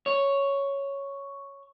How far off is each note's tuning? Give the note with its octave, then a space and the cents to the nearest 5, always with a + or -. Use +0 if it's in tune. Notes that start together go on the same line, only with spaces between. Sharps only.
C#5 +0